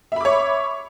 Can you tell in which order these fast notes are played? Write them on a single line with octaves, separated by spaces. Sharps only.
E5 B5 D6 C#5